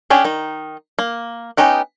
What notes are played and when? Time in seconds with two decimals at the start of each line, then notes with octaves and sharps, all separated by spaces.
0.10 C#4 D4 G4 G#4
0.24 D#3 D#4
0.99 A#3
1.57 B3 C#4 D#4 G4 F#5